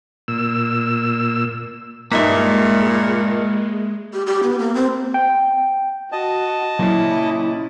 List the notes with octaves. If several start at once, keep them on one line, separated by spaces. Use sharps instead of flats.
A#2 E6
G2 A#2 G#3 A#3 D#4 E5 B6
G4
G4
B3
A#3
C4
G5
F#4 D#5 A5
A#2 C#3 F#3 E4